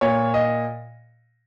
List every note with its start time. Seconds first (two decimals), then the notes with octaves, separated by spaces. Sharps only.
0.01 A#2 C#5
0.34 D#5